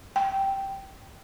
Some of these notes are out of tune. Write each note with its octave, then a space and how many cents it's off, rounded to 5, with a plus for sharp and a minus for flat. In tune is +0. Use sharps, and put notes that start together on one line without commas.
G5 -10